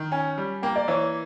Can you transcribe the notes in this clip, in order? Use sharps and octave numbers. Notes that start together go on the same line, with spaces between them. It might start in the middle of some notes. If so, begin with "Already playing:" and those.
Already playing: D#3
C#4 G#5
G3
A#3 G5
D5
E3 C#5